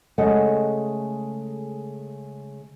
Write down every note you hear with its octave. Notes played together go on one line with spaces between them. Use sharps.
C#3 G#3 A3 A4 D#5 F#5